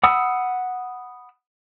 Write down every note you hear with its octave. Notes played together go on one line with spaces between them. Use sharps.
F#5 B5 D#6 E6